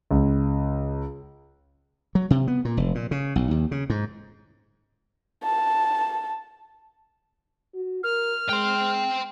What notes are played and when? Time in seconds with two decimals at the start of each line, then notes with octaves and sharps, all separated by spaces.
0.11 C#2
2.15 F#3
2.30 C3
2.48 B3
2.65 A#2
2.77 F1
2.95 A#2
3.11 C#3
3.36 B1
3.51 D#2
3.71 C#3
3.90 G#2
5.44 A5
7.74 F#4
8.03 A#4 F6
8.49 G#3 G5 C6